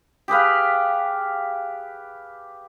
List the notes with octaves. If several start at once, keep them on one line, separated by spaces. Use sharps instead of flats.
G4 G#4 B4 F5